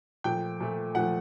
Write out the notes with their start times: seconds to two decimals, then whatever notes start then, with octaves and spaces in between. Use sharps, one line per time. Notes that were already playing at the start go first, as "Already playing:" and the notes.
0.24 A#2 F3 A3 G5
0.60 A#2 F3 A3
0.95 A#2 F3 A3 F#5